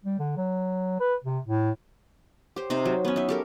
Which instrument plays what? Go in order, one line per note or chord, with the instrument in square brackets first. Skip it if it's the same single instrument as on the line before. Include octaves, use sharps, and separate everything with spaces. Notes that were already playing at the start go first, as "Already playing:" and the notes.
[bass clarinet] G3
D3
F#3
B4
C3
A2
[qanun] G4 C5
C3 D#4 C5
F#3
B3 C#4
D#4 E5
G4 A4 A#4